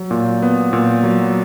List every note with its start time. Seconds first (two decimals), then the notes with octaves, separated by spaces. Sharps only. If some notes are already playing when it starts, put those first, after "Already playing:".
Already playing: F#3
0.11 A#2
0.42 B3
0.73 A#2
1.03 F#3